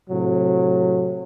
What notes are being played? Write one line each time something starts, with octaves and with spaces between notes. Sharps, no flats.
A2 C3 F#3